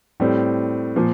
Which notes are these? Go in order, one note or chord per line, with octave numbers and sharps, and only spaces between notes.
A2 G3 C4
A#2 F3